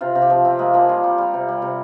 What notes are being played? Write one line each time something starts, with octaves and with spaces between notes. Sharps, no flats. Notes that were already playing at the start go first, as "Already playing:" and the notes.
C3 F4
C3
G4
F3
C3 C4
G#3 A#3
F3 A#3
G3 F4
G3
G3
C3
G3
C3